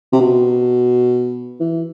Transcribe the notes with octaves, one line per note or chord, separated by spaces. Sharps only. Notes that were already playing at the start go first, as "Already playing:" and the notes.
C3
B2
E3